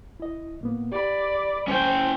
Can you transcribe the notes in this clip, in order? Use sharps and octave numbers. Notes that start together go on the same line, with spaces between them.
E4 D#5
A2 A#3 B3
G4 D5 B5
C#2 C#4 C5 G5